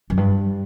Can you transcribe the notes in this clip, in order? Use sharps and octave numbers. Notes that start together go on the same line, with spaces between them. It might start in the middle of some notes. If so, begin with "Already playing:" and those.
F#2
G2